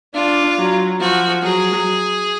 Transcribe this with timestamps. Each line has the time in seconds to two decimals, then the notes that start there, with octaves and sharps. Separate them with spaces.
0.14 D4 F4
0.58 F#3
1.00 F3 F#4
1.44 F#3 G#4